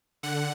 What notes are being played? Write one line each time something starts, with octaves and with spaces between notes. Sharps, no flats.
D3 F#5